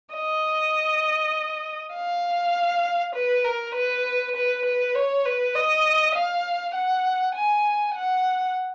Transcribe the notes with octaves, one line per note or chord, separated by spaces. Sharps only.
D#5
F5
B4
A#4
B4
B4
B4
C#5
B4
D#5
F5
F#5
G#5
F#5